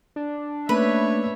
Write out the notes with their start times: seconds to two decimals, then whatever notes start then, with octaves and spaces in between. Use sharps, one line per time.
0.16 D4
0.69 A3 A#3 C#4 B4 C#5 E5